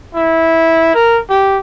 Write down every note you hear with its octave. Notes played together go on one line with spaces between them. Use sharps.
E4
A#4
G4